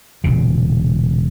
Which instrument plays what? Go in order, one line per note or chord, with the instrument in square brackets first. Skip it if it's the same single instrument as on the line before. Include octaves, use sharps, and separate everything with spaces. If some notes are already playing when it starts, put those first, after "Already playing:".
[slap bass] E1 A#2 C#3